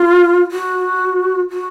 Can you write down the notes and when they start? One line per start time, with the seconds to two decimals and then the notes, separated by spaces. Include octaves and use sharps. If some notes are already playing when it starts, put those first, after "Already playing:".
Already playing: F4
0.52 F#4
1.51 F#4